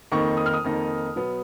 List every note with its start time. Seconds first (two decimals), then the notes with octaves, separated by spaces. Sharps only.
0.12 F2 D#3 A#3 D#4 C#6
0.37 D#6
0.46 F6
0.54 D#6
0.64 F2 D#3 A#3 D#4
1.16 B2 F#3 B3